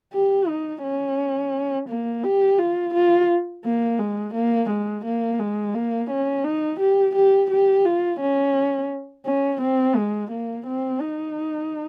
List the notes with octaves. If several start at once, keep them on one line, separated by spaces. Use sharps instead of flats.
G4
D#4
C#4
A#3
G4
F4
F4
A#3
G#3
A#3
G#3
A#3
G#3
A#3
C#4
D#4
G4
G4
G4
F4
C#4
C#4
C4
G#3
A#3
C4
D#4